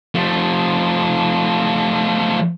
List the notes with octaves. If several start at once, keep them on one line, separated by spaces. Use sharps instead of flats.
F3 A3